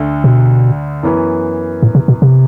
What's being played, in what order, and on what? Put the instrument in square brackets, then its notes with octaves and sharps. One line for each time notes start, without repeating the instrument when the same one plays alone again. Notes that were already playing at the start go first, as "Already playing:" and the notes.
Already playing: [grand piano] D2 D3 A3
[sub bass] B2
[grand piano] F#2 E3 B3
[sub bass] A2
C3
B2
C3